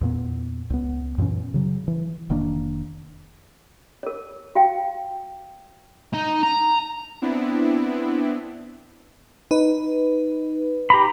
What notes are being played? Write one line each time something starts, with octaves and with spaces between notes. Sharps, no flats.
E2 A#2 B3
C#2 B3
F#2 A#2 E3 C#4
C#3 F#3
E3
F1 D#3 A#3 D4
A#4 C#5
F#4 F5 G5
D#4
A#5
B3 C4 D4 E4
D#4 B4
G4 A#5 B5